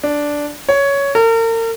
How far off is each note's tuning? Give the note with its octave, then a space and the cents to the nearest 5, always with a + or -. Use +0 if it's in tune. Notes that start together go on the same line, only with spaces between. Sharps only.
D4 -5
C#5 +10
A#4 -40